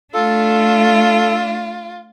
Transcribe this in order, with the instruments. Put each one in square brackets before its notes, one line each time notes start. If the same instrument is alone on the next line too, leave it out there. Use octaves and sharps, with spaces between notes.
[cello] A3 D4 [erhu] F4 [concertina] A4